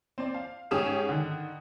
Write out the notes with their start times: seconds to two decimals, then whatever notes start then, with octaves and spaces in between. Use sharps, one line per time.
0.18 C4 D5
0.34 F5
0.71 G#2 C#4 G4 G#4 D#6 E7
1.09 D3 D#3